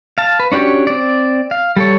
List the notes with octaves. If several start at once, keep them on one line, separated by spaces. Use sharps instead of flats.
F5 A5
B4
C#4 D4 F#4 G4 C#5
C4 D5
F5
G3 A4 C#5